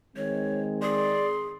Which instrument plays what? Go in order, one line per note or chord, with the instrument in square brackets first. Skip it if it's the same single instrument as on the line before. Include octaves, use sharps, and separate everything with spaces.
[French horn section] D#3 G#3 C4 [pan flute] C#5
[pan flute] G#4 [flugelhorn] D5 [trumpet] C6